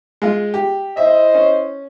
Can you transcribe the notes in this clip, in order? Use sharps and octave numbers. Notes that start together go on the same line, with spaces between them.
G#3 F4
G4
E4 C5 D#5 E5
C#4